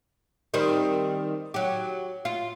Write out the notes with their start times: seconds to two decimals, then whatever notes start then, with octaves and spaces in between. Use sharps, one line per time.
0.54 D#3 G3 C4
1.54 F#3 G4
2.25 F4